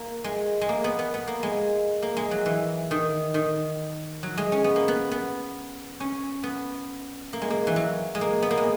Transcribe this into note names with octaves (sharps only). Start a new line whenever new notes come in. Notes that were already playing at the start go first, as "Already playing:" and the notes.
Already playing: A#3
G#3
G#3
A#3
B3
B3
B3
A#3
G#3
A#3
G#3
F#3
E3
D#3
D#3
F#3
G#3
C#4
B3
A#3
B3
B3
C#4
B3
A#3
G#3
A#3
E3
F#3
G#3
A#3
B3
A#3
G#3